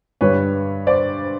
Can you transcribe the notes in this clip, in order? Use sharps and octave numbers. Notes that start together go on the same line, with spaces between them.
G2 D3 G3 B4 C#5
C5 D5